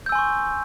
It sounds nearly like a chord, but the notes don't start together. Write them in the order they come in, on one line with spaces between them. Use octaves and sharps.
G6 E6 G#5 C6 C#6